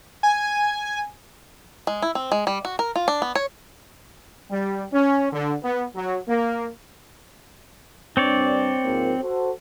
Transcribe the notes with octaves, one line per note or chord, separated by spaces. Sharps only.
G#5
G#3
E4
C4
G#3
G3
F#4
A#4
F4
D4
B3
C#5
G3
C#4
D3
B3
F#3
A#3
G2 C4 D4 C#5 D5
G#2 F3 A#3
F#4 A4 C5